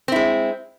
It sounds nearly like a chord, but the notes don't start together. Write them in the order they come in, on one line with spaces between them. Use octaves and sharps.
C4 E4 G#3